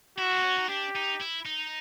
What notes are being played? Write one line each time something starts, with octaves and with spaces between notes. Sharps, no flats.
E4 F#4
C4
C#4
D#4
D4 G4
D#4
E4
D#4